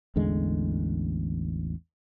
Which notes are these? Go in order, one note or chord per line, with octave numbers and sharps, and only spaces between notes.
A1 E2 D3 G#3